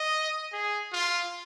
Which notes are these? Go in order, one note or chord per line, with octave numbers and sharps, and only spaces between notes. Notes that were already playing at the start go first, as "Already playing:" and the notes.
Already playing: D#5
G#4
F4